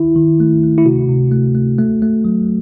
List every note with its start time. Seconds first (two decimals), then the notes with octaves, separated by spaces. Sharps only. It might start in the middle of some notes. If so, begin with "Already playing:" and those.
Already playing: D#3 E4
0.16 D#3
0.40 A3
0.63 A3
0.78 E4
0.85 C3 F#4
1.09 C3
1.32 A3
1.55 A3
1.78 A3
2.02 A3
2.24 F#3